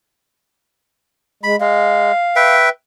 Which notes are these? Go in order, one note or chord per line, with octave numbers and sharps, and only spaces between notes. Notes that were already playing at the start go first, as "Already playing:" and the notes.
G#3 B5
G#3 F5
B4 E5 G5